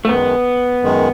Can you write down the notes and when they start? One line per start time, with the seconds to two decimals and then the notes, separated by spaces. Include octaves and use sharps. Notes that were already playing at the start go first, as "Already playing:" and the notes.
0.05 A3
0.09 F#2 D#3 G#3 B3
0.83 F#2 D#3 G#3